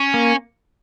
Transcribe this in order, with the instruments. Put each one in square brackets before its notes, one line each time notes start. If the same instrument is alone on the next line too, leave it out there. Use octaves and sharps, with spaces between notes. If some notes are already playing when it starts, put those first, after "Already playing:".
Already playing: [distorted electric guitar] C#4
[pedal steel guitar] A#3